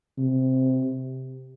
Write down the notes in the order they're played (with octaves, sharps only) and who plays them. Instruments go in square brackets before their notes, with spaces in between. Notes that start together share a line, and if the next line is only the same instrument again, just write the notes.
[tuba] C3